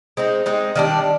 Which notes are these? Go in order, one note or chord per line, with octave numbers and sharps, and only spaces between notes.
G#3 C4 D#4
G#3 C4 D#4
D#3 G3 D4